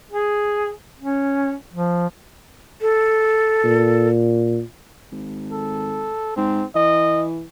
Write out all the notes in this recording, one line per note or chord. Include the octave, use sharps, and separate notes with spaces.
G#4
C#4
F3
A4
A#2
G#1
A4
G#2 C4
E3 D#5